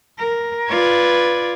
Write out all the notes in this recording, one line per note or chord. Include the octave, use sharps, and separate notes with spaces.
A#4
F4 B4 D5 G#6